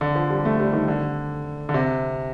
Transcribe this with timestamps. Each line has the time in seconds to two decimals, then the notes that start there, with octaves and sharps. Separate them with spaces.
0.01 D3
0.15 F3
0.30 G3
0.45 A3
0.60 G3
0.73 D#3
0.88 D3
1.69 D3
1.74 C3